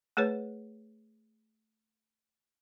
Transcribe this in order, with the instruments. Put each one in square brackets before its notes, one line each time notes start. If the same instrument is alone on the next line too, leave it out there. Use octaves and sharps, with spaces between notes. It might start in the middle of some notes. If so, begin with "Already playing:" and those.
[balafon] A3 G#4 B4 C#5